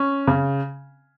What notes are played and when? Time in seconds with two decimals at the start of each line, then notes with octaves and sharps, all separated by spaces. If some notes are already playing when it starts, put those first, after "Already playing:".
Already playing: C#4
0.28 C#3